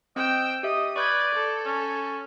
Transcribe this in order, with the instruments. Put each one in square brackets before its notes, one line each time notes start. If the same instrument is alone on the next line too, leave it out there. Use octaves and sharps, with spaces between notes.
[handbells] C4 [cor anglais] D#5 [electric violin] G5 E6
[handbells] G4 E5 [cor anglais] D#5 [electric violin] D#6
[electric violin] B4 [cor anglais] D5 [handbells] C#6 G6 G#6
[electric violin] A4
[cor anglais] C#4